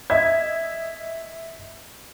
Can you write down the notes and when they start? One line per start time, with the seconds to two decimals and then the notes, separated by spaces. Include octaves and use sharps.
0.10 D#5 E5 G#6